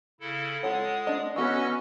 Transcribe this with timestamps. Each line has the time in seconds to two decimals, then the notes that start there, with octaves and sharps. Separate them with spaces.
0.20 C#3 E4 A4
0.63 G#3 F4 A4 C#5 F#5 D#6
1.07 A3 D4 D#5
1.36 E3 B3 C#4 F#4 A4 D#5 C#6 E6